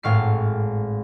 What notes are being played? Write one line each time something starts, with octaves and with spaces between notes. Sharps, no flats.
G#1 A2 F5 C#6 C7